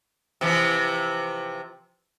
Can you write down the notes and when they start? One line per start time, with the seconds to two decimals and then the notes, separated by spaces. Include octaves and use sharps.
0.41 C3 E3 F3